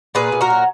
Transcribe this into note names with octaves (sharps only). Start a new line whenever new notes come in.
A#2 G#4 B4
A#2
F#4 A#4
F#3